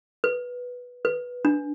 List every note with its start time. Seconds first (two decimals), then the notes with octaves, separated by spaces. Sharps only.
0.24 B4
1.05 B4
1.45 D4